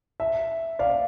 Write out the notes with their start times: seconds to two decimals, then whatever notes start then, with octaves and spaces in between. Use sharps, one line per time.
0.20 E5
0.79 D5 F5